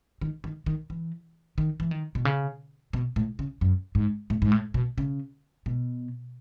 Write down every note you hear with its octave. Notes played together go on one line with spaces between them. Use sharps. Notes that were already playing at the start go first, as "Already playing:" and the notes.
D#3
D#3
D#3
E3
D#3
E3
D#3
B2
C#3
B2
A2
C#3
F#2
G#2
A2
G#2
A2
B2
C#3
B2